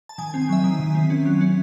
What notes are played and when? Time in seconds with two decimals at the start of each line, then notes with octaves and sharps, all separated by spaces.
0.09 A5
0.18 D#3 G#5
0.30 G#5
0.34 C4
0.42 G#5
0.49 F#3 E5
0.64 D#3
0.79 D#3
0.95 C4
1.10 C#4
1.25 F#3
1.41 C#4